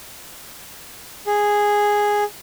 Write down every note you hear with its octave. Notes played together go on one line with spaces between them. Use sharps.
G#4